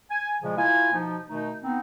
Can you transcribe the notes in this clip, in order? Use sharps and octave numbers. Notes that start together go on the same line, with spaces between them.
G#5
A#2 C#3 F3 G#3
A#3 E4 F4 F5 G#5
B2 F3 D#4
B2 D#3 A3 D#4
B3 C4 D#4